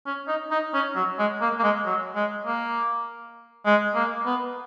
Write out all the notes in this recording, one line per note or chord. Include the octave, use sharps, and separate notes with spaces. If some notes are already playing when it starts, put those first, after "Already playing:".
C#4
D#4
D#4
C#4
F#3
G#3
A#3
A#3
G#3
F#3
G#3
A#3
G#3
A#3
B3